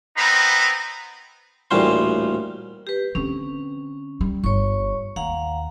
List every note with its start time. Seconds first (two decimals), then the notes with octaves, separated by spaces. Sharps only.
0.17 B3 C4 D#4 A#5 B5
1.71 A1 D2 A#2 G3 C#4 C5
2.87 G4 B4
3.15 D3 C4 C#4
4.21 G3
4.44 G1 C#5 C#6
5.16 D#2 F5 F#5 A#5